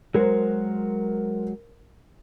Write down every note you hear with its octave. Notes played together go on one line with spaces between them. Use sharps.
F#3 G#3 F#4 A#4 C5